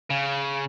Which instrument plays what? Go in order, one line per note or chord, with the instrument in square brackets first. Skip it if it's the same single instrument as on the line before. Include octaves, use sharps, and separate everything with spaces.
[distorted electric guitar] C#3